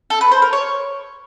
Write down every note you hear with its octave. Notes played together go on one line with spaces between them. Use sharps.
A4
B4
C5
A#4
C#5